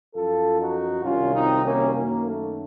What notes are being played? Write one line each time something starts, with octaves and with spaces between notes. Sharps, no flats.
F#2 F3 F4 A4
D#4 F#4
C2 C3 D#3 F#3 C#4 F4
C4 D#4
A#3 C#4
F#2 D#3 F#3 A#3
A3